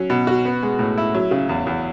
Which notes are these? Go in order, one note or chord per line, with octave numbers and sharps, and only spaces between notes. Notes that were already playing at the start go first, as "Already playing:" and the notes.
Already playing: F#3 C#4
B2
F#4
B3
G#3
A2
E4
F#3
C#3
E2
E2